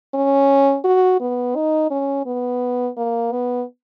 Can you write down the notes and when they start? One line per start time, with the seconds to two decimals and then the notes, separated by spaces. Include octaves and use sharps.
0.14 C#4
0.84 F#4
1.21 B3
1.56 D#4
1.91 C#4
2.26 B3
2.97 A#3
3.32 B3